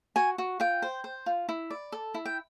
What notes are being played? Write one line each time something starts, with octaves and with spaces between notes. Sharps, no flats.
F#4 G#5
F#4
F4 G5
C5
C5
F4
E4
D5
A4
E4
G5